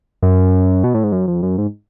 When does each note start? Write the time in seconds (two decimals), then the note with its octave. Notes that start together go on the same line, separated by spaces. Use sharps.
0.22 F#2
0.84 B2
0.94 A2
1.04 G#2
1.12 F#2
1.28 F2
1.43 F#2
1.58 G#2